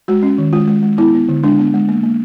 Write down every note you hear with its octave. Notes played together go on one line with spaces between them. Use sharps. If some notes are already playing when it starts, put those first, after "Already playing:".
G#3 F#4
C#4
D#3
G#3 F4
G#3
G#3
B3 E4
B3
D3
G#3 D4
B3
G#3
A#3
A#3